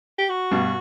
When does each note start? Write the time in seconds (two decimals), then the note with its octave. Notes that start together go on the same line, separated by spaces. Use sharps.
0.18 G4
0.29 F#4
0.51 G2 B2